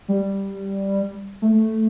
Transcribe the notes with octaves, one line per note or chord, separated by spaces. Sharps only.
G3
A3